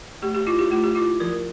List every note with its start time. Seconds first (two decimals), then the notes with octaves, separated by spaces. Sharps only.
0.22 A3 G4
0.35 G4
0.47 E4 F4
0.59 G4
0.71 A3 F4
0.84 G4
0.95 E4 F4
1.20 F3 A#4